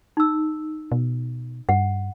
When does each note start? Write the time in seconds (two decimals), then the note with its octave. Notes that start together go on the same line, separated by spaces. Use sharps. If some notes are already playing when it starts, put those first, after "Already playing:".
0.17 D#4 E6
0.92 B2
1.69 G2 F#5